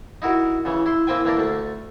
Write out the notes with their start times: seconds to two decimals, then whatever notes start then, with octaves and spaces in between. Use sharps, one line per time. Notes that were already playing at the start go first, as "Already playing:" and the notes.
0.22 D#4 E4 F#4 A#4
0.65 C#3 E3
0.86 E4 C6
1.07 A#3 C4 E4 C5 G5 G#5
1.25 E3 A#3 D4 A#4
1.37 D2 A3